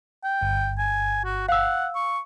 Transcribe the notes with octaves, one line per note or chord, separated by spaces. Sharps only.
G5
G1
G#5
F#4
F5 F#5 E6
C#6